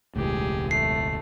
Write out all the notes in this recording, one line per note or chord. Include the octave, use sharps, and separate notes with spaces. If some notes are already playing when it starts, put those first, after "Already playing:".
E1 C#2 A2 G4 G#4
A3 C7